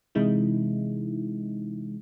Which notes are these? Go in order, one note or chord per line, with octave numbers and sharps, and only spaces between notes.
C3 E3 G#3 D#4 E4